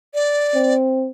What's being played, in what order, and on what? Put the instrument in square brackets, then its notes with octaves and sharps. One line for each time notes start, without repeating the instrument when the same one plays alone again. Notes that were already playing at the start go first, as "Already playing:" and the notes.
[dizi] D5
[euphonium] C4